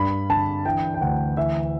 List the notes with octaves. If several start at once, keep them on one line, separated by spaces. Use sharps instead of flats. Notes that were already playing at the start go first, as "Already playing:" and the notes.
Already playing: G2 B5
D3 A5
E3 G5
G5
D2 F#5
E3 E5